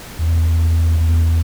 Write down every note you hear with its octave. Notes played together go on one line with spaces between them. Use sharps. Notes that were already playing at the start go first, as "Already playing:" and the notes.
E2
E2